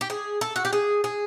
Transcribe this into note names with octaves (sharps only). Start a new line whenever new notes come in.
G4
G#4
A4
F#4
G4
G#4
G#4